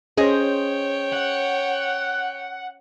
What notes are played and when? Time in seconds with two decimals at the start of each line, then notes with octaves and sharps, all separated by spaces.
0.17 C#4 G#4 C5 C#5 D#5 G5
1.13 F#5